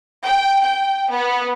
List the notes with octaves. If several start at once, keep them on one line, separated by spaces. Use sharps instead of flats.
G5
G5
B3